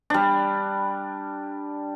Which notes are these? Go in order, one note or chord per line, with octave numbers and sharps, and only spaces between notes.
G3 D4